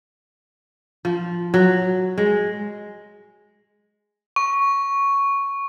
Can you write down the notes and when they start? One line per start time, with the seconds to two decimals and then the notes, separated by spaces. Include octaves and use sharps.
1.05 F3
1.54 F#3
2.18 G#3
4.36 C#6